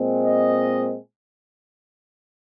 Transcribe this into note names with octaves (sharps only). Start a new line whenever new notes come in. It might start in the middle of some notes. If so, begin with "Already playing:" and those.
Already playing: A#2 G#3 C4
D#5